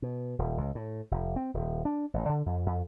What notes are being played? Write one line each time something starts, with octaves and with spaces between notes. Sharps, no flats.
B2
D#1
C#2
A2
F1
C4
D#1
D4
A1
D3
F2
F2